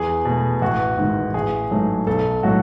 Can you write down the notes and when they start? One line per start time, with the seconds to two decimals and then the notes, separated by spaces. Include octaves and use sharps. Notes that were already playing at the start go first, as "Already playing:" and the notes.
Already playing: E2 G#4
0.25 B2 A3
0.61 A1 F#4
0.98 G#2 D#3
1.34 A1 G#4
1.71 G#2 F#3 A3
2.07 B1 A4
2.43 A2 F#3 A3 F#4